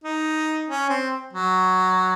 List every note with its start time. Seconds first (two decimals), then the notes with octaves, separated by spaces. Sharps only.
0.04 D#4
0.69 C#4
0.89 C4
1.33 F#3